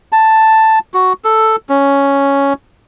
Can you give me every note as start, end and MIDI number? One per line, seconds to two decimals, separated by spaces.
0.12 0.79 81
0.94 1.13 66
1.24 1.56 69
1.69 2.53 61